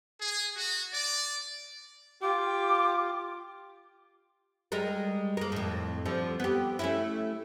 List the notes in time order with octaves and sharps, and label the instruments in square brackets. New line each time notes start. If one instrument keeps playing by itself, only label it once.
[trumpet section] G#4
F#4
D5
[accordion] F4 [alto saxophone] G4 [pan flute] D6
[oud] G3 G#3 A#4
A#3 A#4
F2 A2
D3 F3 G3
B3 G4
A3 C#4 E4